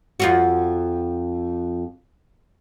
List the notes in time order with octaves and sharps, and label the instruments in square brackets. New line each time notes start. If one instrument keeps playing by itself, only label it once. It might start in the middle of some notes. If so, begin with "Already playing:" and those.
[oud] F2 F4 F#4